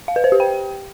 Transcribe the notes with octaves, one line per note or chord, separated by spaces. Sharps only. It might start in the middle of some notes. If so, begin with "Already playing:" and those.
F5
B4
C5
G4
G5